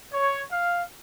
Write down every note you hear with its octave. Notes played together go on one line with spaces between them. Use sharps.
C#5
F5